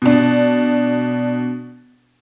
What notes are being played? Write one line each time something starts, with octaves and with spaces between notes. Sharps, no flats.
B2 D4